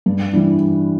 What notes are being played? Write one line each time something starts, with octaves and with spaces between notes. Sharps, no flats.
G2
E3 G3 D4